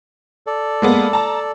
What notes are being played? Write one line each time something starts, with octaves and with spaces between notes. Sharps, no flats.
A4 D5
G#3 A#3 B3
A5 A#5